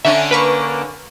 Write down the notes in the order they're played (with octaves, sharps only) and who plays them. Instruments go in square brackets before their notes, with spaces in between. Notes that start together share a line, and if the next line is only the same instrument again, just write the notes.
[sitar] D3 C#4 D4 [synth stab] E5 [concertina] G#5 A#5
[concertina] A#3 A#4 [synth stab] B4 B5 C#6